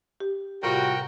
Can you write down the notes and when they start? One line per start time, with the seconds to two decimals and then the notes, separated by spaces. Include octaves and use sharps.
0.20 G4
0.63 A2 C3 G3 F4 F#4 A#4 G5